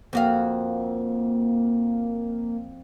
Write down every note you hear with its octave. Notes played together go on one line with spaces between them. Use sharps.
F2 A#3 F#4 F5